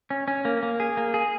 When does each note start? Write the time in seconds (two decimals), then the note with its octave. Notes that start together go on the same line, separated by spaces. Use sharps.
0.10 C#4
0.28 C#4
0.45 A#3
0.63 A#3
0.80 G#4
0.97 A#3
1.14 G#4